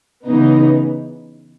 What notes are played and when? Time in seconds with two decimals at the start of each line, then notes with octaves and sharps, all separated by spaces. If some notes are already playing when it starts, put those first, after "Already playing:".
0.25 C#3 E3 B3 D#4